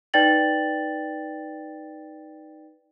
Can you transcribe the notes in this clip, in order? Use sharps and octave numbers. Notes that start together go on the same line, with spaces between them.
D#4 B4 D5 G5 A6 F#7